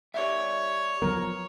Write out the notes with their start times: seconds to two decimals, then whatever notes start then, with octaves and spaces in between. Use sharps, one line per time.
0.14 G4 C#5 D5 E5
1.02 F3 F#3 B3 A#4